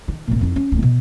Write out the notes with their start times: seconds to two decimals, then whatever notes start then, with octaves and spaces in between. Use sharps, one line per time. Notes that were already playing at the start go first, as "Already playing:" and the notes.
0.08 D#3
0.27 G#1 A#2
0.41 F2 D#4
0.56 C#4
0.71 D1 A1
0.83 B2